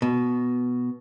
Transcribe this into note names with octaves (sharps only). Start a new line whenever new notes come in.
B2